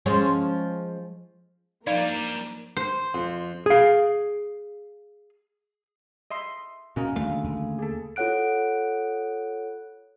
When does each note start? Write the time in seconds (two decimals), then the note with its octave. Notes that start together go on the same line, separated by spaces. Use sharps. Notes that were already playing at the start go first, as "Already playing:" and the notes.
0.06 F3 G#3 C#4
1.87 F3 G3 A#3 D4 D#4 A#4 D5 F5
2.77 C5
3.14 F2
3.66 G#4 F5
6.31 D#5 E5 C6
6.96 A#2 C#3 C#4 F#4 A#4 D#5
7.16 D#2 D3 A3 F5
7.44 D#2
7.79 G#4 A4
8.16 F4 A4 C#5 F#5 F#6 D7